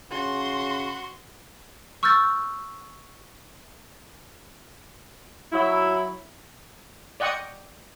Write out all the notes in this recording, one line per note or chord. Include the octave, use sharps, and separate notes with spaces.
C#3 F#4 C6
C#6 E6 F6 G6 A6
F#3 E4
D5 D#5 F#5 G5 C#6 D#6